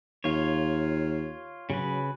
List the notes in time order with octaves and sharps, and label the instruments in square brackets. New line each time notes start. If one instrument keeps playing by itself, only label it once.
[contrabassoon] D#2 [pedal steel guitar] F4 C#5
[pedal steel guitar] C#3 B4 [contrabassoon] F#3